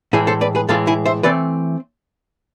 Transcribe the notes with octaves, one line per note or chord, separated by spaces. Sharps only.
A2 E3 G#3 E4 G#4
A4 C5
B4 D5
G#4 B4
A2 E3 G#3 F4 A4
E4 G#4
C5 E5
E3 A3 C4 B4 D5